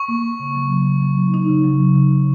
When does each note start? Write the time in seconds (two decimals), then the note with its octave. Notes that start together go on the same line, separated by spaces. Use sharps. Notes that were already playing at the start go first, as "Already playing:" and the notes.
Already playing: C#6
0.08 A#3
0.24 A#3
0.40 C#3
0.55 F#3
0.71 C#3
0.86 A#3
1.02 F#3
1.18 D#4
1.34 D#4
1.49 C#3
1.64 F#3
1.80 C#3
1.96 C#3
2.12 C#3